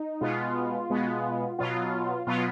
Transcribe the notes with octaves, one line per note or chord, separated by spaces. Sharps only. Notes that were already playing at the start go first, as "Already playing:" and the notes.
Already playing: D#4
B2 G#3 B3 F4
B2 G#3 B3
B2 F#3 B3 F4
B2 F#3 B3 F4